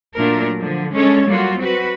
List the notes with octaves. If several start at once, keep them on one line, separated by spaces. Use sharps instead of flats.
A#2 F#3 A3 D4 A#4
D3 F3
G#3 C#4 D4 A4 C#5
F#3 G3 A#3 F4 F#4
C4 F#4 B4